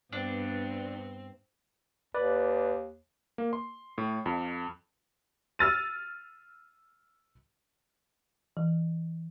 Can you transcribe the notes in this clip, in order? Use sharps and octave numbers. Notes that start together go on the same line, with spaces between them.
G2 B3 C4 D4
D#2 B4 D5
A#3
C6
A2
F2
E6 F6 A6 D#7
E3